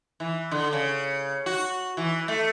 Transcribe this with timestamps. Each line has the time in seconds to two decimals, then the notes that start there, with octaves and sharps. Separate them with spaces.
0.20 E3
0.51 D3
0.73 C#3
1.46 F#4
1.97 E3
2.28 A3